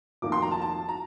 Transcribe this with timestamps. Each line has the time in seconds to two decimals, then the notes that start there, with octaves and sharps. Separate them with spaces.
0.22 F1 F2 D#3 A#3 D6
0.32 C6
0.42 A#5
0.51 A5
0.61 A5
0.89 A#5